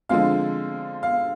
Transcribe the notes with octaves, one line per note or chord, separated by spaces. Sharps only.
D3 F3 G#3 C4 F5
F5